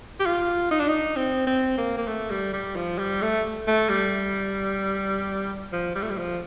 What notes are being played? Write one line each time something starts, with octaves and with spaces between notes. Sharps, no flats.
G4
F4
D#4
D4
D#4
C4
C4
A#3
A#3
A3
G3
G3
F3
G3
A3
A3
G3
F3
G3
A3
G3
F3